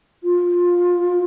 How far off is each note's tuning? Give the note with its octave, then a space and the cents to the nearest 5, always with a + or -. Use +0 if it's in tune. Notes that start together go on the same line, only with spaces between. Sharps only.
F4 +15